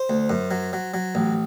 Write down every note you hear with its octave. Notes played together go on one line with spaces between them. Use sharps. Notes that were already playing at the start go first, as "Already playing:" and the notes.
Already playing: C5
D2
F#2
F#3
F#3
F#3
A1